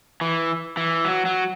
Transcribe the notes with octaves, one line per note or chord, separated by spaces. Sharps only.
E3
E3
F#3
F#3